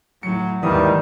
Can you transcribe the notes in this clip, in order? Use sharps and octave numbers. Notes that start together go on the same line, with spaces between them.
A2 F#3 C#7
D#2 G#2 D#3 E3 G3 D#6